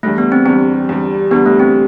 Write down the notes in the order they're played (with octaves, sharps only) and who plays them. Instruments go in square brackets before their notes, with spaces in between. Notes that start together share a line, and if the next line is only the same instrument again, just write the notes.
[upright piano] E2 D3 G3 [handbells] A3
[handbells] B3
C4
[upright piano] E2 D3 G3 [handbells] C4
[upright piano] E2 D3 G3
[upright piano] E2 D3 G3 [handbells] B3
[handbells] A3
C4